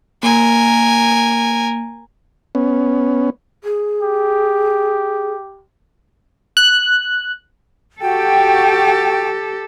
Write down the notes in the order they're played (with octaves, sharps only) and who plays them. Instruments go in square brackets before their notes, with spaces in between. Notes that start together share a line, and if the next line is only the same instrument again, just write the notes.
[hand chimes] A#3 [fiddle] A#4 G#5
[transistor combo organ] B3 C#4
[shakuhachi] G#4
[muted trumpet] G4
[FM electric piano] F#6
[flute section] F#4 G5 [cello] G4 A4